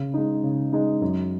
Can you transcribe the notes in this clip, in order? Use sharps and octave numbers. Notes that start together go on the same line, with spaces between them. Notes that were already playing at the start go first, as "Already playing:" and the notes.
Already playing: C#3
G#3 D#4
C#3
G#3 D#4
F#2